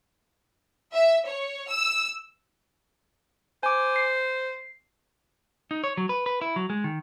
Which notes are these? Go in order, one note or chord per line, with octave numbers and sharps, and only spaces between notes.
E5
C#5
E6
C5 G#5 D6
C7
D#4
C#5
F#3
B4
B4
E4
F#3
G#3
D#3